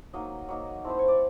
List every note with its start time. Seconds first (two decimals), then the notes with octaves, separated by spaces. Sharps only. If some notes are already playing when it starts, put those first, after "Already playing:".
0.14 F#3 A#3 D#4 D#5
0.49 F#3 A#3 D#4
0.84 A3 C4 E4 C5
0.99 C#5
1.08 D5